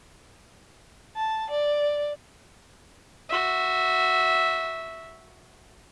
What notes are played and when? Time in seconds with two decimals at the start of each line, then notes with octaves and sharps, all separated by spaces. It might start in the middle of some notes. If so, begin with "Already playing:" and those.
1.16 A5
1.50 D5
3.29 F#4 E5